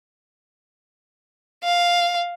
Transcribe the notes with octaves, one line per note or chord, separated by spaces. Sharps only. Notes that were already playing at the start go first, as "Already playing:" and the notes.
F5